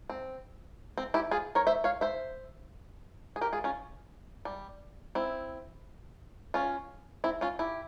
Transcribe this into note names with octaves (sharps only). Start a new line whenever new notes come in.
C4
C4
E4 G4
F4 G#4
A#4 C#5
C5 E5
C#5 F5
C5 E5
G#4
G4 A#4
F4 G#4
C#4 F4
G3
C4 E4
C#4 F4
C4 E4
C#4 F4
E4 G4